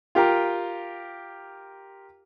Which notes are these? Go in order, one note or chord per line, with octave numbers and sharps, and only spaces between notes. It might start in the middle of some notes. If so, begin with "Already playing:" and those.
F4 G4 A#4